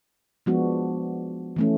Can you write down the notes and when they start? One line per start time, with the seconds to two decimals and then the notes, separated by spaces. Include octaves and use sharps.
0.46 F3 G#3 B3 D4 F#4
1.56 E3 A3 C#4